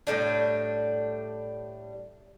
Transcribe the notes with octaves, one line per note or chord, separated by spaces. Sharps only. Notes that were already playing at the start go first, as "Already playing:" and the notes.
A2 C#3 G3 D4